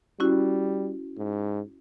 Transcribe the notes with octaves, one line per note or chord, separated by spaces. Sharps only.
G3 C#4 E4 F#4
G#2